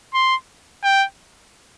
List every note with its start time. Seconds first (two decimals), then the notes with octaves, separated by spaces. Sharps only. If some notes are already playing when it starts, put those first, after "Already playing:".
0.14 C6
0.84 G5